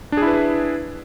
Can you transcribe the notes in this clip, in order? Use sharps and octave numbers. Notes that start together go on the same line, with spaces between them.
D4 E4 G#4 B4